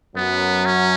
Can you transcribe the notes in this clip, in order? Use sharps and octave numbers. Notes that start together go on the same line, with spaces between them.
F#2 F#3 B3
C#4